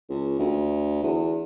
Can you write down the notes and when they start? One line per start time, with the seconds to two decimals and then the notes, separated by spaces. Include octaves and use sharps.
0.09 C#2
0.39 D2
1.03 E2